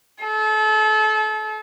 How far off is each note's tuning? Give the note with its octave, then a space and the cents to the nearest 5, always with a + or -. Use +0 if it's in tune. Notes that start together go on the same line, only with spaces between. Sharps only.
A4 -35